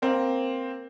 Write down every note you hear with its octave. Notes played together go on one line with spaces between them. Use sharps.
A#3 C4